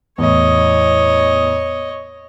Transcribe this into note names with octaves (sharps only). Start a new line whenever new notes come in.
E2 A2 C#5 D#5